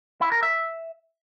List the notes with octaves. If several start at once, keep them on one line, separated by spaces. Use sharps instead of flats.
E4
A#4
E5